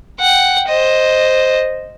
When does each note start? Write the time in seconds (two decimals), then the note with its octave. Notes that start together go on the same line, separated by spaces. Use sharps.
0.20 F#5 G5
0.69 C5 D#5